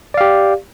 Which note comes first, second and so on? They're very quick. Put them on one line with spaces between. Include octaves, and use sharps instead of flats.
D5 F5 G4